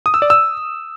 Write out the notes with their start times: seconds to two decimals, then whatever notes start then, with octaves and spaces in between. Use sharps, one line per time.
0.06 D#6
0.14 E6
0.22 D5
0.30 E6